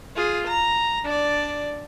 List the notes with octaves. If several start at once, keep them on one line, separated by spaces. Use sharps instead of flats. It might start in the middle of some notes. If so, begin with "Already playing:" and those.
F4 G#4
A#5
D4 D5